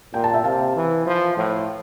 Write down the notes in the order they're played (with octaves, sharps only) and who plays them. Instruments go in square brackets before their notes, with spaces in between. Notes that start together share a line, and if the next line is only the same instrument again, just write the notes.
[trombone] A#2 [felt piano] G5
[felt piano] A5
E5 G5
[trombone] C3 [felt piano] F5 A5
[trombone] E3
F3
A2